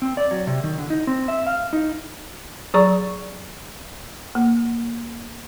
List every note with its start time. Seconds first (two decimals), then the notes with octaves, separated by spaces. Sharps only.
0.02 C4
0.17 D5
0.31 F#3
0.47 C3
0.64 D#3
0.78 D3
0.90 D#4
1.07 C4
1.28 E5
1.47 F5
1.73 D#4
2.74 F#3 G#4 D5 A#5 C#6
4.35 A#3